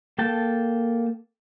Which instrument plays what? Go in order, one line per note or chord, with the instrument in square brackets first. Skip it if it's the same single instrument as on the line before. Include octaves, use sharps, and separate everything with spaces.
[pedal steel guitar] A#3 A4 G5 A5